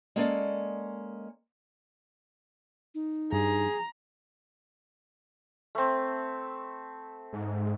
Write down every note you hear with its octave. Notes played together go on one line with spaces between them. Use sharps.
G#3 A#3 C#4 A4 A#4 D5
D#4
G2 G#4 A#5
A3 C4
G#2